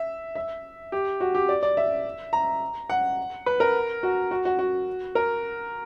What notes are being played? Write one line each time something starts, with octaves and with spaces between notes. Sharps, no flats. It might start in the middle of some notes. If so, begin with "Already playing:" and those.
Already playing: E5
E5
G4
F#4
G4
D5
D5
E5
A#5
F#5
B4
A#4
F#4
F#4
F#4
F#4
A#4